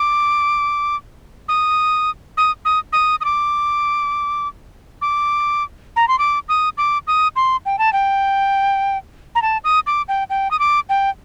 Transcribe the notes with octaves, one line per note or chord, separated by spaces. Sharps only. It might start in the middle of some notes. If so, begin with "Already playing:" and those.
Already playing: D6
D#6
D#6
D#6
D#6
D#6
D6
D6
A#5
C6
D6
D#6
D6
D#6
C6
G5
A5
G5
A#5
A5
D#6
D6
G5
G5
D#6
D6
G5